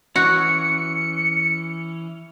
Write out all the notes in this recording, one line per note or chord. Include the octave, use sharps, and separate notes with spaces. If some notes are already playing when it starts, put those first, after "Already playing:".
E3 C#4 F#4 C#7